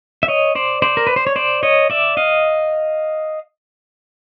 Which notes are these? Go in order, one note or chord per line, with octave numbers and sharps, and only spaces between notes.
E5
C#5 D#5
C5 D5
C5 D5
A#4
B4
C5
C#5
C5 D5
C#5 D#5
D5 E5
D#5 F5